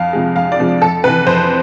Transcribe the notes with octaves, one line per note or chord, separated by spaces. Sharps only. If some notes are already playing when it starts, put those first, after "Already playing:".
Already playing: F2 F5
C3 F3 G#3
F2 F5
D5
C3 F3 G#3
F2 A4
C3 E3 B4
F2 C5